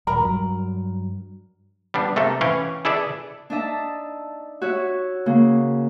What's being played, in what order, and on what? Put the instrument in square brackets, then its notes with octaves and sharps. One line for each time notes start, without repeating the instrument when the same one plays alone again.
[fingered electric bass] D#1 [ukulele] A#4 A#5 B5
[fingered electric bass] G2 F#3
[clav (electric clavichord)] G3 B3 D4
C3 A3 A#3 A4
E3 C#4 C#5 F5 G5
E4 G#4 A4 B4 D5 E5
[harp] D4 D#4 D#5 E5 A5
F#4 C#5 E5
C#3 A#3 C#4